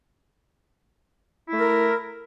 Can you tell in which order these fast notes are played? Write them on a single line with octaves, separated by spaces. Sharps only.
E4 A3 A#4